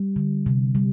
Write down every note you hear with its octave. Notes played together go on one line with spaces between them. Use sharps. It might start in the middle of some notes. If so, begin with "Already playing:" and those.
Already playing: G3
D3
C3
G3